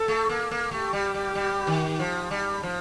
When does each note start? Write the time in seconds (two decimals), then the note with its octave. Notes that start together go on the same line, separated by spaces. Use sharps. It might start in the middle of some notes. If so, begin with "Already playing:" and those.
Already playing: A4
0.08 A3
0.29 A#3
0.51 A#3
0.71 A3 G4
0.93 G3
1.14 G3
1.35 G3
1.67 D#3
2.00 F3
2.31 G3
2.63 F3